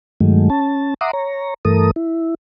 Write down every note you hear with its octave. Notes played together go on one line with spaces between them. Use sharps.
G2 D#3 F#3 G#3 A3
C#4 A5
E5 F#5 A#5 C6 D6 D#6
C#5 A#5
G2 E3 A3 A4 A#4 D#6
E4